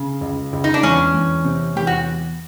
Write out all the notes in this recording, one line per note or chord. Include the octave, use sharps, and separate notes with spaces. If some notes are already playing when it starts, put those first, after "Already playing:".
Already playing: C#3
C#2
C#2
D#4
D4
E2 C#4
E2
C3
E2 G4
F#4